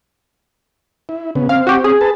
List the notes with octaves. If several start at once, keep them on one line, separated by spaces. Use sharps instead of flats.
E4
C#3 B3
C4 F5
F#4 G4
G#4
B4 A5